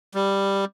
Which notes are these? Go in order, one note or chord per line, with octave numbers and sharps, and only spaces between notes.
G3